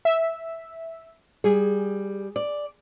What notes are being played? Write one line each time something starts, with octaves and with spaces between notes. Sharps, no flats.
E5
G3 G#4
D5